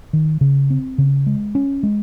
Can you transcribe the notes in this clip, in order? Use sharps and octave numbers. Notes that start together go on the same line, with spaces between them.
D#3
C#3
C4
C#3
G#3
C#4
G#3